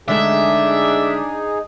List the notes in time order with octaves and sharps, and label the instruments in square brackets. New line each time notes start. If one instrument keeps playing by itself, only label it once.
[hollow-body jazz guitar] D3 G#3 A3 [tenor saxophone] D4 [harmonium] D#4 G#4 [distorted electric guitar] E5